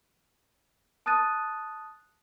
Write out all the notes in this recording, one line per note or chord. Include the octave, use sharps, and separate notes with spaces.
A5 D#6 F#6 A6 D#7